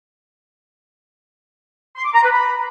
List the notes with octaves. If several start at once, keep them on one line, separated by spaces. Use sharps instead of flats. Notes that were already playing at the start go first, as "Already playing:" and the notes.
C6
D6
A#5
B4
B5